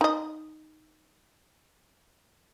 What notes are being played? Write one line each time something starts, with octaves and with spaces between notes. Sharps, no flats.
D#4 D#5